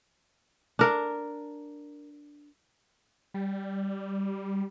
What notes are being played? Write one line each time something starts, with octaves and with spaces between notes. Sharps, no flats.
D4 A#4
G3